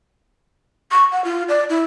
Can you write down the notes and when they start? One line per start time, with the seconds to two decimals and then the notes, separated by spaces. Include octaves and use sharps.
0.92 C#6
1.12 F#5
1.25 F4
1.49 D5
1.70 E4